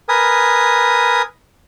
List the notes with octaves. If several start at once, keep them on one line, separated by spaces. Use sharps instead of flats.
A#4 B4 G#5 D#6